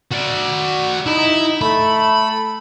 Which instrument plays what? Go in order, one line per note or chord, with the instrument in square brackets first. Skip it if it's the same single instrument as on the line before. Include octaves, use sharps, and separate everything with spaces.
[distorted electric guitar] F#4 D5
[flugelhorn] D#4 [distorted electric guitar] E4
[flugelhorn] A3 [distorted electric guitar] B5